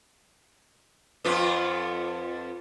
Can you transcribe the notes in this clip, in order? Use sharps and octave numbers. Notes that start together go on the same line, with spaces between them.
F2 B3 F4